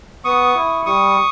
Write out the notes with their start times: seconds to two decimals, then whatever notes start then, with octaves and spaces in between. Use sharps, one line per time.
0.24 B3 C#6 D#6
0.55 E4
0.85 G3 C#6 D#6